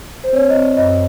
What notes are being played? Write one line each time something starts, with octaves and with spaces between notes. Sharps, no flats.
C5
C4 C#5
D#5
C4 D5
F#2 D#5